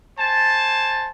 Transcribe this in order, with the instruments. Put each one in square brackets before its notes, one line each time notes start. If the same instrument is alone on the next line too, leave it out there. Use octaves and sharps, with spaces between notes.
[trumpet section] C5 G#5 A5